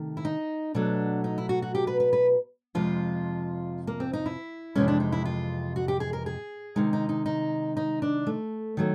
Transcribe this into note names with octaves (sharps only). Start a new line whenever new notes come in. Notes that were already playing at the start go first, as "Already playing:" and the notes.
Already playing: C3 D#3 A3
E4
D#4
B2 F#3 A3 D4
D#4
E4
F#4
F#4
G4
B4
B4
B4
F2 C3 F3 G#3 F4
A#3
C4
D#4
E4
F2 C3 E3 G#3 C#4
D4
D#4
E4
F4
F#4
G4
G#4
A#4
G#4
C3 D#3 G#3 D#4
D#4
D#4
D#4
D#4
D4
A3
D#3 F#3 A3